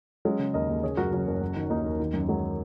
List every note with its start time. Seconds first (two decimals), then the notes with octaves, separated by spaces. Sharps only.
0.25 F#3 G#3 C#4
0.39 C#3
0.54 D#2 A#4 D#5
0.70 D#2
0.83 C#3 G#4 C#5
0.97 F#2 F#4 A#4
1.12 F#1 C#4 F#4
1.27 F#1
1.41 F#3
1.56 D#3
1.70 D#2 A#3 D#4
1.85 D#2
2.00 D#3
2.13 F#2
2.29 F#3 G#3